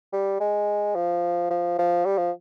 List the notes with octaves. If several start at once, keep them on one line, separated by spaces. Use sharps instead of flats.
G3
G#3
F3
F3
F3
G3
F3